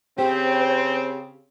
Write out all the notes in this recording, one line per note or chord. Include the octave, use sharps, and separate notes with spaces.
C#3 C4 G4 C5